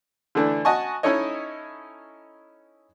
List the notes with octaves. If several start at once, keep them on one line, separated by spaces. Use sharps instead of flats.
D3 E3 A3 D4
F#4 D#5 G#5 A5 C#6
C#4 D#4 E4 A4 C#5 D#5